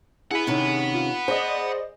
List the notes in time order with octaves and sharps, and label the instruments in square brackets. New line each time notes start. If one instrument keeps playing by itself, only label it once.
[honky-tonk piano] E4 G#4 [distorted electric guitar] F#5 B5
[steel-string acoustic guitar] C3 D#3 C#4
[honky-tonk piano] F4
[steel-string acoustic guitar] G#4 [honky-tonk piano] C5 D5 D#5